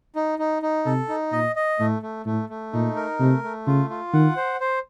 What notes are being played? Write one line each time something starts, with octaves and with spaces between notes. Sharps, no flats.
D#4
D#4
D#4
C3 A4
D#4
A#2 D#5
D#5
A2 A3
A3
A2 A3
A3
A#2 D#4
A#4
C3 A3
A3
C#3 F4
F4
D#3 F#5
C5
C5